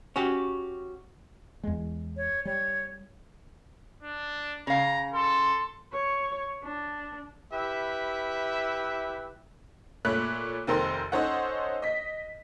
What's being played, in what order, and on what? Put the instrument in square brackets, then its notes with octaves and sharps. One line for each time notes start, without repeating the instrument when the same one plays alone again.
[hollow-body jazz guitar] C#4 F#4 G4
[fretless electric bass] E2 G#3
[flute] C#5
[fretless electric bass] G3 [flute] C#5
[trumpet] D4
[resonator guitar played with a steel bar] C#3 F5 [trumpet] A#5
[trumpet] A4 [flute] C6
[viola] C#5
D4
[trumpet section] E4 G4 B4 E5
[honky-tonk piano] A#2 A3 C#5 B5 F#6
F1 D#3 C4 A4 A#4 C6
C#4 D#4 A4 C5 C#5 F#5
D#5 B6